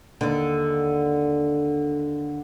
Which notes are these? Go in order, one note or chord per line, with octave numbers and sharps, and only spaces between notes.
D#2 D3